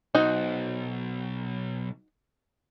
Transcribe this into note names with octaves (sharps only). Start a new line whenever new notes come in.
B1 D#4 F#4 C5